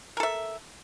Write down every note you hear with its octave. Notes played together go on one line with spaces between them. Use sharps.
A4 A#4 E5